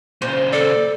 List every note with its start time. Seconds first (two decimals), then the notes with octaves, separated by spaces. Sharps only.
0.22 A#2 C#3 C5
0.53 A4 D5